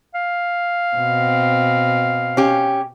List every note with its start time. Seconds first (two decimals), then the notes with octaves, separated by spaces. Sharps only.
0.15 F5
0.96 B2 C4
2.37 C#4 G4